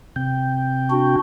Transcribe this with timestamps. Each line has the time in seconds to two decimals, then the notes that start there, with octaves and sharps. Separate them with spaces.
0.16 C3 G5
0.90 D4 F#4